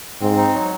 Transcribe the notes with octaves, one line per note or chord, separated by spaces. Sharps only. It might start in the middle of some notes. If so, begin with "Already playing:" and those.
G#2 C4
D#4
F#3